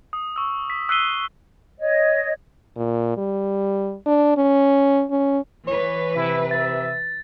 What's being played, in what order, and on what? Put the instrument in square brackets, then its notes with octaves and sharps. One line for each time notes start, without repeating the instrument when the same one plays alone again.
[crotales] D#6
C#6 E6
B6
E6 F#6 B6 C7 D#7 G7
[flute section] C#5 D#5
[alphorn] A#2
G3
D4
C#4
C#4
[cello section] E3 B4 [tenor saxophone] C#5
[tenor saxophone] C3 [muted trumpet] E4
[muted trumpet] E5 [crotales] A6